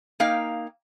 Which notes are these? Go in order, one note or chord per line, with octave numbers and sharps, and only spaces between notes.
A#3 D#4 F5 G5